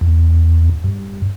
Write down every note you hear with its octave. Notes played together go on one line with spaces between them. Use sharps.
E2
G2